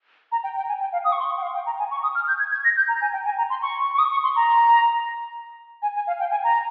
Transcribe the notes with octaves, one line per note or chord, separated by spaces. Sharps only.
A#5
G5
G5
G#5
G5
F5
D#6
C#6
C6
C#6
G5
F5
G5
A#5
G#5
C#6
D#6
F6
G6
G#6
G#6
A#6
G6
A#5
G#5
G5
G#5
A#5
C6
C#6
C#6
D#6
C#6
C6
A#5
G#5
G#5
F5
G5
G#5
A#5